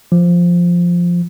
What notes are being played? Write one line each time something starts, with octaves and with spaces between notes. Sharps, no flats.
F3